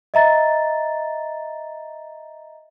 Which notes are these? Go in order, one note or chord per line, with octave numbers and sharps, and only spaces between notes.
D#5 E5 A#5 A6